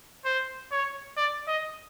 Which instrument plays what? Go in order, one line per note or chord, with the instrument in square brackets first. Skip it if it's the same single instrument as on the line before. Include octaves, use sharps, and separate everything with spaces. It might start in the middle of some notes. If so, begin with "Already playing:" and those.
[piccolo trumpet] C5
C#5
D5
D#5